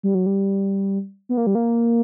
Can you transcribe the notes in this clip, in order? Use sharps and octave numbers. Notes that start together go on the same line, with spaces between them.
G3
F#3
G3
B3
A#3
G3
A#3